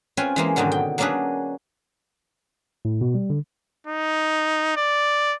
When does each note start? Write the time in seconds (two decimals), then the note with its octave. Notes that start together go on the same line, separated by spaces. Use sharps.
0.17 C4 C#4 F4 B4 G#5
0.36 E3 G#3 A#3
0.56 G#2 B2 D3 D#3 F#3
0.72 G5
0.98 F#3 A#3 C#4 D4 G#4 B4
2.85 A2
3.01 B2
3.14 G3
3.30 D3
3.87 D#4
4.77 D5